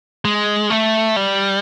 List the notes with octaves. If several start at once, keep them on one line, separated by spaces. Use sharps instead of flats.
G#3
A3
G3